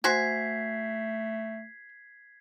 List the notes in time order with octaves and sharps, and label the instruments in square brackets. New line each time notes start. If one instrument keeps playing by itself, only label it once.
[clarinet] A3 [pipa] F#4 C5 G#5 [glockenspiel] G#6 B6 C7